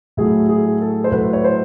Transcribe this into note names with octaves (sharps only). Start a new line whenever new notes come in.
A2 F#3 A3 G#4
G#4
A4
C5
A2 F#3 A3 B4
C#5
C5